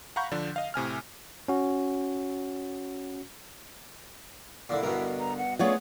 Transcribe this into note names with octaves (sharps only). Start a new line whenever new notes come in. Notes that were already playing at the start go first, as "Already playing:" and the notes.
F5 F#5 A#5 B5 C#6 G6
D3 F3 D4
D#5 F5
A2 C3 G#5 F6
C#4 F#4
A#2 D3 E4
G2 B2 D3 A#4
A#5
F#5
A3 B3 C#4 F4 G#4 C#5 D5 F#5